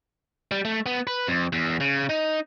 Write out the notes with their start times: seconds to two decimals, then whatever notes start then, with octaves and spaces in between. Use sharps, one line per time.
0.51 G3
0.65 A3
0.86 B3
1.07 B4
1.27 F2
1.53 E2
1.80 C#3
2.09 D#4